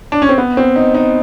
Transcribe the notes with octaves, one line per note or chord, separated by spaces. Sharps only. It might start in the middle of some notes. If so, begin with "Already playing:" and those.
D4
C#4
C4
B3
C4
D#4
D#4